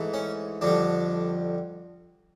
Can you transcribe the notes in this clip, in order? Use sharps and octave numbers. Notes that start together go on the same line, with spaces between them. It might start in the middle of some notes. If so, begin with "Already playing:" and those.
Already playing: G#2 E3 A3
C#4
F2 D3 G3 D4